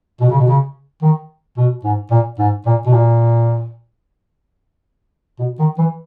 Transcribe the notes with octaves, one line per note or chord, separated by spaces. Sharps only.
B2
C#3
B2
C#3
D#3
B2
G#2
A#2
G#2
A#2
B2
A#2
B2
D#3
E3